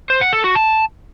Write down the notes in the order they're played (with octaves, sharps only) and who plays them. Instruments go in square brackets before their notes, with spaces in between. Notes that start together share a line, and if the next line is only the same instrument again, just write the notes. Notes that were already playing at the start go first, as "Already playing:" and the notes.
[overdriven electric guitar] C5
F#5
A4
F#4
A5